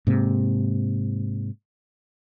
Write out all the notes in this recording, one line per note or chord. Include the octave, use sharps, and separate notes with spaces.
G#2 C3 A#3